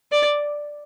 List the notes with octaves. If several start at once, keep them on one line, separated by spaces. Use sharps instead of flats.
D5